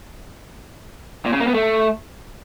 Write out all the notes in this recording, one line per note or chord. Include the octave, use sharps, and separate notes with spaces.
A#2
C#3
A#3
B3
A3